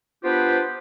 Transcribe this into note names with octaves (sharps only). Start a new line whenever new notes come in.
B3 D4 F4 G4 B4 C5